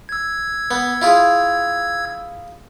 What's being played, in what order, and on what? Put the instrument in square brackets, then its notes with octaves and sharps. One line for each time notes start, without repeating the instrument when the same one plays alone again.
[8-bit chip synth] E6 G#6
[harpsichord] B3
E4 F4 G#4